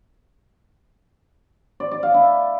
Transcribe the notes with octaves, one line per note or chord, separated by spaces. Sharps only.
D5
D5
F5
E4